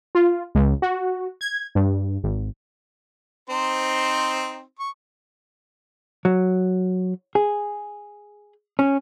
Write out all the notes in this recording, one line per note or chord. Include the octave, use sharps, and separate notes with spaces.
F4
C#2
F#4
G#6
G2
G#1
C4 D#4 C5
C#6
F#3
G#4
C#4